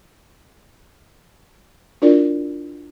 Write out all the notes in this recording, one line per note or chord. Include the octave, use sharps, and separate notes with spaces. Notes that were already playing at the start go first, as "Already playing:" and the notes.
D4 E4 F4 A#4 D5